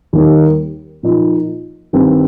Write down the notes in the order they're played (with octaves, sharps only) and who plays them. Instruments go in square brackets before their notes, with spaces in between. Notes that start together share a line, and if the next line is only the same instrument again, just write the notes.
[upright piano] D#2 D#3 G3 A#3
A#2 F3 D#4
G2 D#3 C4